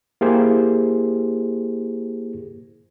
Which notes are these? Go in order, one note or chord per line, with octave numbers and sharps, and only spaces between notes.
A#3 E4 G4 G#4 C5